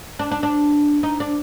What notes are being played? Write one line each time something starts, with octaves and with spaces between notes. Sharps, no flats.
D4
D4
D4
D#4
D4